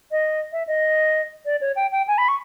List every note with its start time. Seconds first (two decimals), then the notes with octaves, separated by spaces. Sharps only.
0.11 D#5
0.52 E5
0.67 D#5
1.46 D5
1.61 C#5
1.76 G5
1.92 G5
2.08 G#5
2.18 B5
2.28 C#6